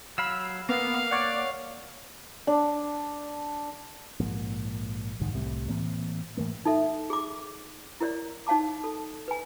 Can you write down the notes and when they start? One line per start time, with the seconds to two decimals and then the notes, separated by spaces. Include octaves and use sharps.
0.18 F#3 F5 B5 E6
0.69 A#3 B3 F5
1.11 C#5 D5 F#5
2.47 D4
4.20 A#1 G#2 F3 A#3
5.20 F#1 C2 G#2 D#3
5.33 C2 A2 C3
5.69 A2 E3 A#3 C4
6.37 A2 E3 A3 A#3
6.65 D#4 A4 E5
7.10 G#4 D6
8.00 E4 A#4 C#5 D5
8.47 D#4 C#5 F5 A5 D6
8.84 A4
9.28 B4 G#5